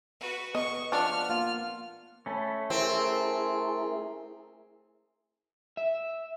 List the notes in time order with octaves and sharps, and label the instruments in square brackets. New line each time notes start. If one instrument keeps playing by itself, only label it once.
[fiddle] F#4 B4
[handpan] B3 [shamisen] D#5 [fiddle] C#6
[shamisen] F3 B3 D4 [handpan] F#5 [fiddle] F6
[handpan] A#3 [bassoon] F4
[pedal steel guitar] A3 C#4 [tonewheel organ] B5
[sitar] C4 [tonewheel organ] E4 G#4 A#4
[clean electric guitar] E5